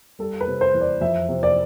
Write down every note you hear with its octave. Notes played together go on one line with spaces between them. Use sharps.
G3 A4
B4
C3
C5
E2
D5
F2 E5
C3
D5